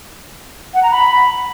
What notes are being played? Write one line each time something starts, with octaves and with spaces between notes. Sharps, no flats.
F#5
A#5
B5